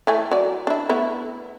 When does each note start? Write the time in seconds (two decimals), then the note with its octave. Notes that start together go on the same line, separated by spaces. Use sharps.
0.07 E3 A3 G#5
0.31 F#3 D5
0.67 D4 E4
0.89 A3 B3 E4